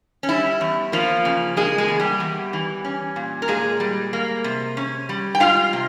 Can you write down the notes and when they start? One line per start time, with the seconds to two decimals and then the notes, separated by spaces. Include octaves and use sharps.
0.23 C#4
0.29 G3 E4
0.61 E2
0.92 F3 A#3 F4
1.25 C#3
1.57 G#3 A#3 G#4
1.78 G#3 G#4
1.88 E2
1.99 G3 G4
2.20 E2
2.53 E3
2.85 C#4
3.16 A#2
3.42 A#4
3.48 A#2 G#3 G#4
3.80 G3
4.13 A#3
4.44 C3
4.77 C#4
5.09 G3
5.35 G5
5.40 G#3 F4 F5
5.73 C3